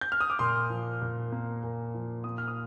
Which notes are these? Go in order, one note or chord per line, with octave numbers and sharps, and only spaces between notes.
G6
F6
D#6
D6
A#2 C6
F3
A#2
A#3
A#2
F3
A#3 D#6
F6
D#6